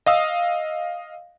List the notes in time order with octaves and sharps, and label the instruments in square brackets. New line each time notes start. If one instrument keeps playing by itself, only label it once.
[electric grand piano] D#5 F5 D#6 E6